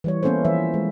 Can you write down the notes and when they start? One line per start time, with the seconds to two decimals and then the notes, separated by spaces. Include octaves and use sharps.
0.04 E3 G3 C#5
0.23 A#3 B3 C#4 E4 A4 C5
0.45 E3 F3 E5
0.74 G#3